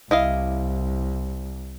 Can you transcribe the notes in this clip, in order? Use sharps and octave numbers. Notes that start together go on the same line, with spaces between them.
C2 E4 D#5 F5